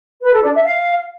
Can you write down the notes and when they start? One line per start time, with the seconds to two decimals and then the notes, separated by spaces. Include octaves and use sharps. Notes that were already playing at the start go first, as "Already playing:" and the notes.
0.23 B4
0.33 A4
0.43 D4
0.53 E5
0.64 F5